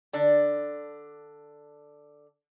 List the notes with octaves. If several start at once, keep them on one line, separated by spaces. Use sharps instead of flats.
D3 D4